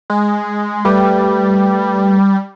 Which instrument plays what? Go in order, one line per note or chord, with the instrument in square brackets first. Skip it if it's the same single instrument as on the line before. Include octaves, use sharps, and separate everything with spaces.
[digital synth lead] G#3
[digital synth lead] G3 [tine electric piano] A3 G4 B4